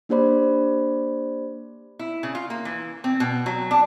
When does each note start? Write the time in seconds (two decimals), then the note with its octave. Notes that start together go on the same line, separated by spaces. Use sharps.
0.09 A#3 D4 G4 C5 D5 B5
1.99 E4
2.23 C#3
2.35 F4
2.50 A#3
2.65 E3
3.04 C4
3.20 B2
3.46 F#3
3.71 D4